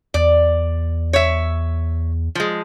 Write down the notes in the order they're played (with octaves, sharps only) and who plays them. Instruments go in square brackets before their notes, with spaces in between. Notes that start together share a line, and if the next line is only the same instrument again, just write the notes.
[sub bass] E2 [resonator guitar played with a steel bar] D5
[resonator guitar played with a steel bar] C#5 E5
F3 G#3